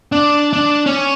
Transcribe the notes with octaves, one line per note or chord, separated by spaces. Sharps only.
D4
D4
C#4